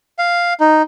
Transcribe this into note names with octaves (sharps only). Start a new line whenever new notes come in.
F5
D#4